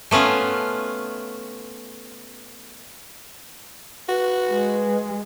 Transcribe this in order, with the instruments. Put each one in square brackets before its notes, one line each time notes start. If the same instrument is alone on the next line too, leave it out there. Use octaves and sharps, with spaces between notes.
[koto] A3 B3 C#4 F4
[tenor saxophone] F#4 [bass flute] B4
[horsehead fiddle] G#3